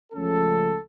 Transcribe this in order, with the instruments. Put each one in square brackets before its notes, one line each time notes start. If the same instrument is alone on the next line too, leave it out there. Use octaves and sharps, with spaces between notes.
[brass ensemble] C#2 C#3 F3 A3 C#4 A4